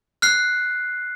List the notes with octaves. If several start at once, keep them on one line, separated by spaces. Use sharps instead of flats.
F6 F#6 C7